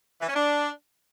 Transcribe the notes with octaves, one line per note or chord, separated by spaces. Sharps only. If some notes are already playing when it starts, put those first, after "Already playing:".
E3
C#4
D4